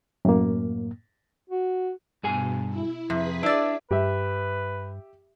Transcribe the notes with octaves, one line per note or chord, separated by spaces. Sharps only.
F#2 A2 A#3
F#4
G2 B2 G#4 G#5
E4
F2 C3 G#4 B4 B6
D4 E4 D5
G2 G4 B4 E5